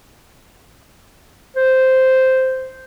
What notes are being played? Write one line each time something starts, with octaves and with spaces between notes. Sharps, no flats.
C5